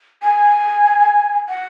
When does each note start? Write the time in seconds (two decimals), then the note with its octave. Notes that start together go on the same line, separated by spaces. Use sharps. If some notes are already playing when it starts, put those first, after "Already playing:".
0.22 G#5
1.49 F#5